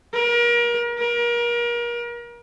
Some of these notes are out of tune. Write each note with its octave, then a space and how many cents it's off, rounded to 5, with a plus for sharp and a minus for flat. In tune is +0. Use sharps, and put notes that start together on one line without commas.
A#4 +35
A#4 +35